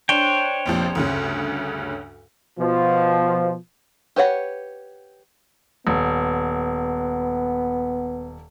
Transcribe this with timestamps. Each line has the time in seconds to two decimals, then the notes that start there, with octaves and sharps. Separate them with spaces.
0.09 D4 C5 C#5 G5
0.66 F1 A#1 F3
0.95 D2 G2 C#3
2.59 B2 F3
4.16 G4 B4 C#5 F#5
5.87 D#1 B3